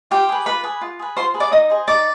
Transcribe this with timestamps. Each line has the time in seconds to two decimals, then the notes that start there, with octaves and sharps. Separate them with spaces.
0.11 F4 G4 G5
0.29 G#4 B4
0.46 F4 B4 B5
0.64 G#4 B4
0.81 F4
0.99 G#4 B4
1.17 F4 C5 C6
1.34 G#4 B4
1.40 D5 D6
1.51 D#4 D#5 D#6
1.70 G#4 C5
1.87 D#4 D5 D6